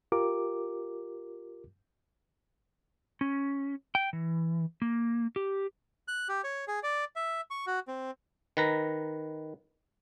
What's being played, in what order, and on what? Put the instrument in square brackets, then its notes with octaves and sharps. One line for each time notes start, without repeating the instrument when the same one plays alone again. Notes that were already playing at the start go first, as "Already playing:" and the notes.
[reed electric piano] F4 G4 A#4 D6
[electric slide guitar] C#4
G5
E3
A#3
G4
[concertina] F#6
G4
C#5
G#4
D5
E5
C#6
F#4
C4
[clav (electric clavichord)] D#3 B4 A#5